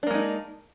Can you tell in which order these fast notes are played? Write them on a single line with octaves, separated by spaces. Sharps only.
D4 A#3 G#3 D#4